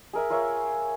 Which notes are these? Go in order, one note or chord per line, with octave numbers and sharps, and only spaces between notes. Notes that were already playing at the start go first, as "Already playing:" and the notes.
G#4 A#4 E5
F4 A#4 C#5 E5